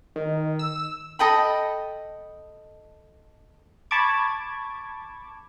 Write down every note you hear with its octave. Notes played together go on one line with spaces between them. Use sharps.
D#3
E6
A4 D#5 G5 B5
A5 B5 C#6 D6 G#6